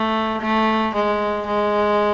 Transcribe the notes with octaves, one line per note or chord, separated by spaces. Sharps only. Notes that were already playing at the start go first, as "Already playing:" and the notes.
Already playing: A3
A3
G#3
G#3